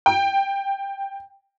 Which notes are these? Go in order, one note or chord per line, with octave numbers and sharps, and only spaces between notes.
G5